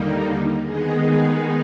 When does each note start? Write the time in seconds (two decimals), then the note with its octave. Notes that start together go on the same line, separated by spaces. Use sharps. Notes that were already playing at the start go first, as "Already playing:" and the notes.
Already playing: D#2 D3 G3 A#3 D#4
0.62 D#3 G#3 B3 D#4 G#4
1.02 G#4